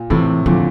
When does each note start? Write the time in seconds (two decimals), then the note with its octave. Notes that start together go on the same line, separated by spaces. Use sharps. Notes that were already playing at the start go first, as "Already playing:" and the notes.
Already playing: A#2
0.10 A2 C3 E3
0.46 A#2 D3 F3